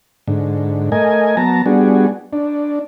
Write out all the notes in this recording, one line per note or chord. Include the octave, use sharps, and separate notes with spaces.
G#2 D3
A3 A#4 D#5 G#5
F#3 B3 A5 A#5
G3 B3 D4 F#4 G#4
D4